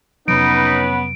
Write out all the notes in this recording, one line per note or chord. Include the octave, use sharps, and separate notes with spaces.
F2 C3 F#3 B3 C#4 D#4 B4 D7